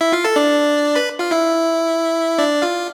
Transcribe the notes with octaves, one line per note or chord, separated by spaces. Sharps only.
E4 E5
F4 F5
A4 A5
D4 D5
B4 B5
F4 F5
E4 E5
D4 D5
F4 F5